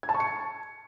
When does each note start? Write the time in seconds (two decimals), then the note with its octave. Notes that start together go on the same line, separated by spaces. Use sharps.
0.03 G#6
0.09 A5
0.14 C#6
0.20 C#7